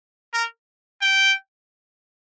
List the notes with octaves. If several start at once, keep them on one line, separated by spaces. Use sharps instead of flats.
A#4
G5